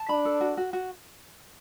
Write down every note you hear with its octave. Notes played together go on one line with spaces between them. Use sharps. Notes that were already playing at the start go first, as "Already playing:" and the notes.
Already playing: A5
D4 B5
A4
F#4
F#4
F#4